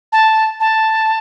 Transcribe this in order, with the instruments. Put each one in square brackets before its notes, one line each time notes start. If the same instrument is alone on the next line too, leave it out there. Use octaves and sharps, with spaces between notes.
[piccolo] A5
A5